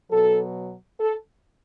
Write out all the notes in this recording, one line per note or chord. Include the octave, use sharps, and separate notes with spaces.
B2 F#3 A4
A4